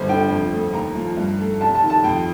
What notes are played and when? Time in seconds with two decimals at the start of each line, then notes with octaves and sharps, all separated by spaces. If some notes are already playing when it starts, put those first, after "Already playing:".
Already playing: G1 C5
0.09 D3 G5
0.30 F2
0.52 A3
0.73 D#2 A#5
0.95 F3
1.17 G2
1.39 A3
1.61 F1 A5
1.75 A5
1.82 D#3
1.90 A5
2.04 F2 G5